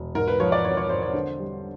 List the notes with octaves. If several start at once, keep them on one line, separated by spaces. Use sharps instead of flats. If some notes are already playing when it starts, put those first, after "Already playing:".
Already playing: E1
G#2 A#4
B4
F3 C#5
D5
G#1 C#5
C#5
G#1 C5
C#5
D3 C5
G3